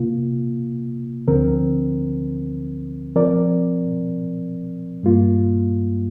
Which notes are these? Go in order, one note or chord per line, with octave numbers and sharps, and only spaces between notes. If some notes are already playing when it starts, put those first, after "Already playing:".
Already playing: C3 A#3 F4
D2 D3 F3 C4 A#4
F3 C4 A#4 D5
G2 G3 A#3 F4